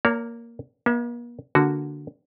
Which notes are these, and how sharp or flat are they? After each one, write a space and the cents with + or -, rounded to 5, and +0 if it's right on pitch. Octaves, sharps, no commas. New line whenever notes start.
A#3 +0 C#5 +40 A#5 -40
A#3 +45 E5 +0
D3 +0 A#3 +0 F#4 +0